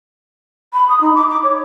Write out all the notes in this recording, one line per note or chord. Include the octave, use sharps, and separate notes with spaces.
B5
D#6
D#4
D6
D6
C#5